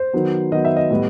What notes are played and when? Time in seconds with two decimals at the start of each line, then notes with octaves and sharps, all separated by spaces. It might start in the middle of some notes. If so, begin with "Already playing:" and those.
Already playing: C5
0.13 D#3 F#3 B3
0.52 D#3 F#3 B3 D#5
0.65 E5
0.77 D#5
0.91 A2 G3 B3